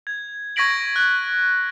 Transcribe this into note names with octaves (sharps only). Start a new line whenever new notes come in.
G#6
C#6 G#6 A#6 B6 D7 F#7
F#6